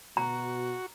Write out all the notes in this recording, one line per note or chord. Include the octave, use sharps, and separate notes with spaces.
B2 F#4 A#5